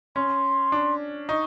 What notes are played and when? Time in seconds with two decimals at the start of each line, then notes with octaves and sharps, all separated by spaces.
0.16 C#4 C6
0.72 D4
1.29 D#4 C#6